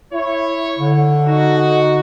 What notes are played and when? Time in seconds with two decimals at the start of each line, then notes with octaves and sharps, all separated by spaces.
0.13 E4 C#5
0.79 D3
1.27 D#4 F#4